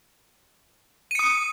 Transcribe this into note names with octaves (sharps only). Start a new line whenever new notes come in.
D#6 C#7 D#7